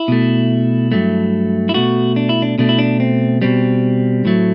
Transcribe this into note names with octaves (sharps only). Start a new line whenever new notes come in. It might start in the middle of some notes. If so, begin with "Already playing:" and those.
Already playing: E4
B2 A3
G2 F#3 A3
E4
B2 A3 F#4
D4
E4
D4
B2 A3 D4
E4
D4
C4
B2 G3 C4
A2 F#3 A3